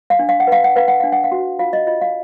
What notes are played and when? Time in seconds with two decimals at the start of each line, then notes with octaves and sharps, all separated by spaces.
0.10 F5
0.19 D4
0.29 F5
0.40 F#5
0.47 B4 F5
0.64 F#5
0.76 B4 F5
0.88 F#5
1.00 D4 F5
1.12 F#5
1.24 F5
1.32 F#4
1.59 F4 F5
1.73 D#5
1.87 F4 D#5
2.01 F5